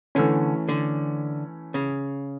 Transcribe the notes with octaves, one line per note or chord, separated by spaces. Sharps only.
D3 E3 A3 C#4
D3
C#3